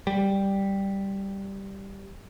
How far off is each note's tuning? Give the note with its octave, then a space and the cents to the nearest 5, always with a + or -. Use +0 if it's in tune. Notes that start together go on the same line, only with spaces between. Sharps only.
G3 +0